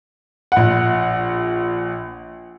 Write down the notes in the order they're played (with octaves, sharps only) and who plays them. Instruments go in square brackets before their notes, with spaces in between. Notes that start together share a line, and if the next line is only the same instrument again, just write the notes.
[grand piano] A#1 F#5